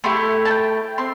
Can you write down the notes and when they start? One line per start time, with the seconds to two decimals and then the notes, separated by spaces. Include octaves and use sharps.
0.04 A3 E4 G4 C6
0.45 A5
0.50 G5
0.98 C4 C6